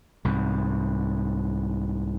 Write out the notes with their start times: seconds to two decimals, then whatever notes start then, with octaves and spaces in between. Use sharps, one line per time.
0.25 C2 G#2